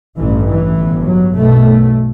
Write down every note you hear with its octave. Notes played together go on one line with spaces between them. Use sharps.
A1 G2 E3
E3
G1 G2
F#3
B1 B2 A3